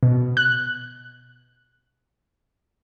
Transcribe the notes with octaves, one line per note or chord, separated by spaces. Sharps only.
B2
F#6